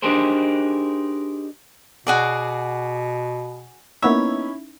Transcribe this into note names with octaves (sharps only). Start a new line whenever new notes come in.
D4 D#4 G4 G#4 A#4 C5
B2 F#4 G#4 D5 F#5
A#3 B3 C#4 D#4 E4 C#5 E5